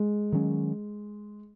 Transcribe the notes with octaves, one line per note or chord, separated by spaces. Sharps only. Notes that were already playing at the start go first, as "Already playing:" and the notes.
Already playing: G#3
D#3 F#3 C#4